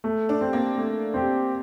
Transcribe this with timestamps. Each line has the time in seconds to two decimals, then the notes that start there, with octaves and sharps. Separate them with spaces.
0.04 A3
0.29 D4
0.41 C4 G4
0.53 A#3
0.78 A3
1.14 C4 G4